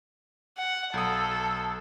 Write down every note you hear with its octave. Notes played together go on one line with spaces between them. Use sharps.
F#5
B1 A4 D#6